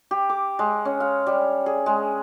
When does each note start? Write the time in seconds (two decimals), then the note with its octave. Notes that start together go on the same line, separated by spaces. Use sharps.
0.11 G4
0.30 D6
0.59 G#3
0.85 C#4
1.00 F5
1.27 G3
1.66 G#4
1.86 G#3